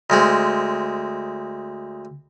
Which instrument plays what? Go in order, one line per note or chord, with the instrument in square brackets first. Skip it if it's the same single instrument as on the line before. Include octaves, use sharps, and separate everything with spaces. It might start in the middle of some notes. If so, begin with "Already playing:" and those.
[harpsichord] D2 G#3 C4